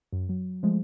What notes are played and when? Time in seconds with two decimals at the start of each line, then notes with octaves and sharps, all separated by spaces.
0.12 F#2
0.29 F#3
0.63 F3 G#3 A3